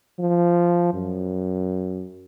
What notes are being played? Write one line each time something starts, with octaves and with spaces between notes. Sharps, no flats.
F3
F#2